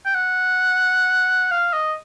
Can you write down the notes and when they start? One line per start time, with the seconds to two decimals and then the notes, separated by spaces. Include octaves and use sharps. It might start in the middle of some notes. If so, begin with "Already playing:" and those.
0.06 G5
0.15 F#5
1.51 F5
1.73 D#5